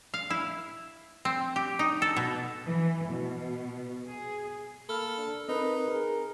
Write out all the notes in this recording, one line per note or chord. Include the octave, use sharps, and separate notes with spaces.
F5
E4
C4
G4
D#4
A4
B2
E3
B2
G#4
A#3 A4 B5 F6
D4
C4 D#4 A#4 B4
G#4 A#4